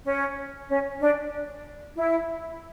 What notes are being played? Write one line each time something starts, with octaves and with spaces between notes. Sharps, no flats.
C#4
C#4
D4
E4